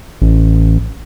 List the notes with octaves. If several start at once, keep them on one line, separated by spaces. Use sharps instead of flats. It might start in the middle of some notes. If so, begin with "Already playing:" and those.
A1